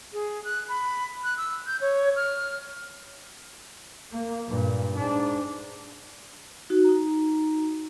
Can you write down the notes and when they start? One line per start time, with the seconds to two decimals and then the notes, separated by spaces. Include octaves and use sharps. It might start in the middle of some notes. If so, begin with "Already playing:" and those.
0.13 G#4
0.44 F#6
0.69 B5
1.24 F#6
1.38 E6
1.67 G6
1.81 C#5
2.16 F6
4.12 A#3
4.48 G2 A#2
4.96 G#2 D4
6.70 D#4 F#4
6.84 D#4 A#5